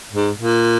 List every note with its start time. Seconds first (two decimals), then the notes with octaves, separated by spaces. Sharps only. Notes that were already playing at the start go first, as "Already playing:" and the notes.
0.13 G#2
0.38 A#2